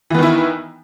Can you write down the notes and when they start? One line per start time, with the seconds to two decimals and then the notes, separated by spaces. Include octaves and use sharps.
0.10 E3
0.14 B3
0.19 D#3
0.23 E4